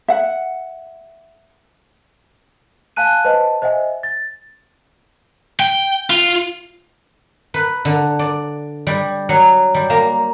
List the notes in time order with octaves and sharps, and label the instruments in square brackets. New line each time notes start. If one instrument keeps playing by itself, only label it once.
[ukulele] E5 F#5
[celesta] F5 G#5 A5 F#6 D#7
B4 C5 D#5 A5
C5 D#5 E5 F#5 G#5
A6
[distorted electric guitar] G5
F4
[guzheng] B4
D3
D5
G3
F#3
G3
A#3